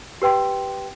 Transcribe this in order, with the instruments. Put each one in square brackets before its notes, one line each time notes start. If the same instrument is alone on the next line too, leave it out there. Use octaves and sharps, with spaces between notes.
[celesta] G4 B4 G5 C6